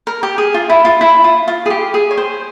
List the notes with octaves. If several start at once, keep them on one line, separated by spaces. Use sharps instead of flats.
A#4
G4
G#4
F4
E4
F4
E4
F4
F4
G#4
G4
G#4
C#5
C5